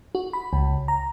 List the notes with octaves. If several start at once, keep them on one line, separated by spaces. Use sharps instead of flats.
F#4
B5
C#2
A#5